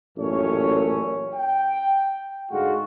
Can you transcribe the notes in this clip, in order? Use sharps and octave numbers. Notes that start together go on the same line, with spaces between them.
A1 F#2 A#2 A3 C#4 C#5
G5
G#2 D3 G#3 F4 F#4